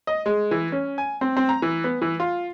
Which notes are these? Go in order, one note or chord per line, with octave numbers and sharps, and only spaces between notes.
D#5
G#3
E3
C#4
G#5
C4
C4
A#5
E3
B3
E3
F4